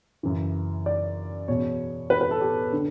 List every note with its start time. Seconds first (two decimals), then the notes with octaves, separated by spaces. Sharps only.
0.23 F#2 C#3 E3
0.86 D5
1.48 E2 B2 C#5
2.10 B4
2.21 B4
2.31 A4
2.41 G4
2.73 D3